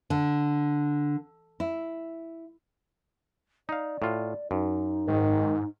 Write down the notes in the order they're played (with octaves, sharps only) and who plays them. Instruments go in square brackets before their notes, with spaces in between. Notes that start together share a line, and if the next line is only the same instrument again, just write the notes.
[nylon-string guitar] D3
E4
[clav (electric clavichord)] D#4 F5 [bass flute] D5
[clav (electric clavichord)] A2 F4
[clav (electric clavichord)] F#2 [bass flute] D#4
[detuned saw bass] G#2 [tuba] D#3